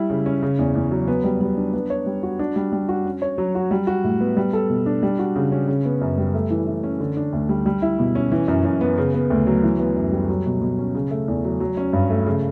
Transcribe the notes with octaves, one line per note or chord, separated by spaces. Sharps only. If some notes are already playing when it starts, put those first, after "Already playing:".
Already playing: G3 E4
C#3
C#4
C#3
E2
E2
F#3
B3
G3
G3
D4
B3
C#5
G3
F#4
D4
G3
G3
F#4
C#4
C#5
F#3
F#4
G3
F#4
A2
B3
G3
A4
B2
D4
G3
F#4
C#3
C#4
C#3
B3
F#2
G3
A3
E3
E3
C#4
D3
D4
D2
G3
G3
E4
B2
C#4
E3
F#2
F#2
B3
C#3
B3
D2
F#3
E3
B3
F#2
G3
F#3
B2
B2
C#4
C#3
A3
E2
F#3
F#3
C#4
G2
A3
C#3